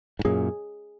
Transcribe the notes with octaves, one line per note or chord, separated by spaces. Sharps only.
G#2
F#2 A#2 G#4